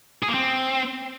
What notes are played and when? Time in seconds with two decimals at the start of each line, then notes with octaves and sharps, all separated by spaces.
0.23 G#4
0.28 A#3
0.34 C4